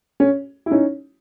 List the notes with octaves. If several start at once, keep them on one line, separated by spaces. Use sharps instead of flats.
C#4
E4
C#4 D#4